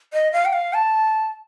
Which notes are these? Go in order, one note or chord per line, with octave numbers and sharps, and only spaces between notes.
D#5
F5
G5
F5
A5